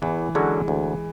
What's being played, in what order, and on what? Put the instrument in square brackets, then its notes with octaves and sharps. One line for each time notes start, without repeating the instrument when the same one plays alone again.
[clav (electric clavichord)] E2 [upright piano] E3
[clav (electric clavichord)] D3 F#3 C#4 F#4 [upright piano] G#3
[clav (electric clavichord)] D2